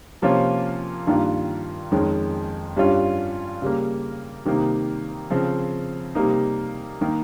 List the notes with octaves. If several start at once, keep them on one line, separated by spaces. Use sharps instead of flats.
C3 F3 A#3 C#4 F4
G2 D#3 A#3 F4
F2 D#3 G#3 C#4
G2 G3 C#4 F4
C#3 G3 A#3
C3 D#3 G3 A#3 D#4
C#3 F3 C4
C3 G3 A#3 D#4
D#3 A#3 D#4